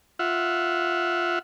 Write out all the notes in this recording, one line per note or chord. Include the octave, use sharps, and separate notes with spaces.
F4 E5 F#5